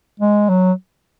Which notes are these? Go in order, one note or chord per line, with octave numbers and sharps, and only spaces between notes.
G#3
F#3